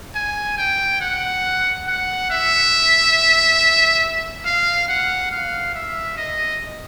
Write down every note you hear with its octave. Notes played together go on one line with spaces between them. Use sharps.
G#5
G5
F#5
F#5
E5
F5
F#5
F5
E5
D#5